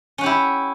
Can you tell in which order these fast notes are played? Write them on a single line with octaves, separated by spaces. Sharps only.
C#4 F#5 G4 E4